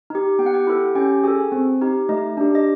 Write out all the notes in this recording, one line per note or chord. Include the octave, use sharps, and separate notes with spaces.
D#4 G4
B3 G5
F#5
G4 G5
E4 A4
C#4 G4 G5
F#4 G#4 A4 G#5
C4
D#4 G4
A3 D#4 D#5
D4 G4
D#5